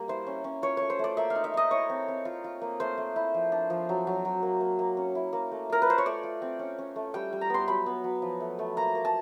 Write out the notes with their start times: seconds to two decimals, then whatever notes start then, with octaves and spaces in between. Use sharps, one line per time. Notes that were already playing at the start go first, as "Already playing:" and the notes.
Already playing: G3 A#3
0.08 E4 C5
0.27 C#4
0.44 C#4
0.62 F4 C#5
0.77 A3 C#5
0.90 C5
0.99 A3 D5
1.17 A#3 E5
1.30 F5
1.35 D#4
1.44 E5
1.54 D#4 D#5
1.71 E4 C#5
1.90 C4
2.08 C4
2.25 F4
2.44 F4
2.61 A#3
2.80 A3 C5
2.98 A3
3.16 E4
3.34 F3
3.52 D4
3.70 F3
3.89 F#3
4.07 F#3
4.25 F#3
4.42 A#3
4.61 A#3
4.79 A#3
4.97 C#4
5.15 E4
5.33 A#3
5.51 A3
5.70 F4 A#4
5.82 B4
5.87 F4 C5
5.98 C#5
6.06 A3 D5
6.23 F4
6.42 C4
6.59 C#4
6.79 C#4
6.96 A3
7.14 G3 G5
7.33 G3
7.41 A#5
7.50 B3 C6
7.68 F#3 B5
7.86 B3
8.04 F#3
8.22 F3
8.40 A3
8.59 A3
8.77 A#3 A#5
8.95 A#3
9.05 A5